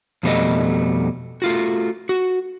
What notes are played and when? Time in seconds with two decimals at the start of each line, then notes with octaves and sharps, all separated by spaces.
0.23 F2 B2 G3 A3 D#5
1.42 A3 F4 F#4
2.09 F#4